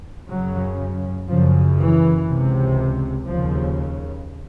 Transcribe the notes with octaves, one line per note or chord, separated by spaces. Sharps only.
F#2 C#3 F#3
F#2 C#3 F3
E3
C#2 C3
D#2 C#3 F3